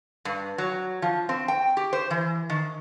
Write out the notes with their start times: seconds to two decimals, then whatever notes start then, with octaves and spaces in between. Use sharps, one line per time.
0.25 G2
0.58 F#3
1.02 F3
1.29 C4
1.48 G5
1.77 G4
1.93 C5
2.11 E3
2.50 D#3